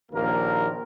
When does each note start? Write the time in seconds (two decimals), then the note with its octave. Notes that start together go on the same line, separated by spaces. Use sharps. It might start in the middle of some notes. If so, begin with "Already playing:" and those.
0.12 A#1 D#2 A#3 A#4